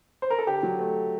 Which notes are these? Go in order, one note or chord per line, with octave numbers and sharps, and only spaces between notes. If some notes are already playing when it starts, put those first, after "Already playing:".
C5
A#4
A4
D3 G4
F#3
A3